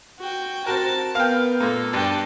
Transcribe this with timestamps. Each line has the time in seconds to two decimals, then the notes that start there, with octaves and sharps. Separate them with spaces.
0.19 F#4 G5
0.66 C4 F#4 A#4 A5
1.15 B3 A#4 F5 G5
1.60 A#2 A#3 A4
1.93 G2 D4 G5 A5